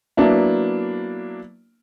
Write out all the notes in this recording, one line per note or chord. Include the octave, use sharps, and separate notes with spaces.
F#3 A#3 B3 D4 E4